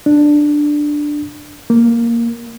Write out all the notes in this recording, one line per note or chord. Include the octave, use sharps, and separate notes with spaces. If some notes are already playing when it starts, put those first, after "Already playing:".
D4
A#3